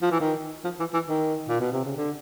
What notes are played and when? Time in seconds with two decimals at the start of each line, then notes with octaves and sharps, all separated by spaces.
0.02 F3
0.11 E3
0.20 D#3
0.64 F3
0.79 E3
0.94 E3
1.08 D#3
1.48 A#2
1.60 B2
1.72 C3
1.85 C#3
1.97 D3